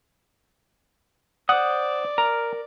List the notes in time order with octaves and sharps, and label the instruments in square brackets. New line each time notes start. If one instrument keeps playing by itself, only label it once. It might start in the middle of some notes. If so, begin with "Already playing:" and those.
[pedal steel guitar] C5 D#6 [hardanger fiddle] D5 [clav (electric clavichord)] F#5
[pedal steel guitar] A#4 [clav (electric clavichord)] A#5